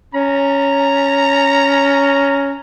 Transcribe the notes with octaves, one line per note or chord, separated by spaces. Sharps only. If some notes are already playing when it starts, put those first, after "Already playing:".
C#4 A#5